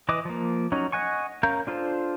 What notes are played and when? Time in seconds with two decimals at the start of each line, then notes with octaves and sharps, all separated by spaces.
0.09 E3 B4 D#5 D6
0.25 F3 A#3
0.72 F#3 C#4 D#4
0.92 D#5 F#5 G#5 C#6
1.43 C#4 A#4 F5 A#5 G6
1.67 D4 F4 A4 C5